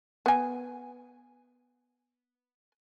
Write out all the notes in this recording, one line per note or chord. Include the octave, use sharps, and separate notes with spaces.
B3 G#5